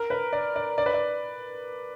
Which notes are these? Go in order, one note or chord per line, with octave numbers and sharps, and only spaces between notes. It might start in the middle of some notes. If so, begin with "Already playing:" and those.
Already playing: A#4
B4
D5
D5
D5
B4
D5